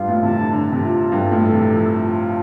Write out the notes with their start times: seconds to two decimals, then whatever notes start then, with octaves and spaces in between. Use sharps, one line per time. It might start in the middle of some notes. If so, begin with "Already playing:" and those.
Already playing: G2 F4 F5
0.08 A2
0.23 C3 A5
0.38 D3
0.53 D3 A5
0.72 C3
0.83 F4
1.12 G2 A4
1.32 A2
1.42 A4
1.52 C3
1.72 F3 A5
2.02 F4